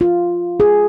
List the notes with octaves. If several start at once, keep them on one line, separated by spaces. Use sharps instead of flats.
F4
G#4